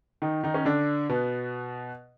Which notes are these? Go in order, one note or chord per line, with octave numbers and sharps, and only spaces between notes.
D#3 D#4
D#3 D#4
C#4
D3 D4
B2 B3